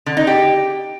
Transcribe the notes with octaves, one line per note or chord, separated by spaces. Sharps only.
D3
D#4
G4